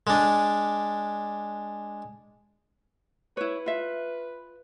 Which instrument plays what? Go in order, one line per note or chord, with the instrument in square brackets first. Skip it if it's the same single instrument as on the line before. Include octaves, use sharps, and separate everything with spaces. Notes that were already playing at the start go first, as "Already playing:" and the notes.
[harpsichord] G#3 D4
[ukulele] E4 C#5 [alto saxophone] B4
[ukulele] F4 E5